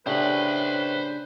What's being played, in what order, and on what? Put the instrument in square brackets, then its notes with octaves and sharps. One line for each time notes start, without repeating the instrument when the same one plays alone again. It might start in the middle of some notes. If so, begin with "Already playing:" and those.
[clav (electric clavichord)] A2 [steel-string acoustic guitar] C#3 D4 G4 [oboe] B4 [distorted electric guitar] C5 B5